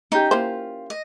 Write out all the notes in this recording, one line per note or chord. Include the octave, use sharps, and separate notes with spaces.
C#4 D#4 G4
A#3 E4 F4 C5
D#5